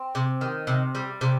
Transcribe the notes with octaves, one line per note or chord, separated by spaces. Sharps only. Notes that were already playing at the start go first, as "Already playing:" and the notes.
Already playing: C4
C3
D#3
C3
G3
C3